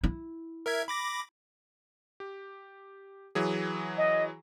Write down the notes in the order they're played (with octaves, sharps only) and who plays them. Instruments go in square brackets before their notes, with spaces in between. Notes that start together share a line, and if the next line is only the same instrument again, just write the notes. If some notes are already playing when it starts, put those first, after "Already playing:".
[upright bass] E4
[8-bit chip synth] A#4 E5 G#6
B5 D6 A#6
[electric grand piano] G4
E3 F#3 G#4
[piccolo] D#5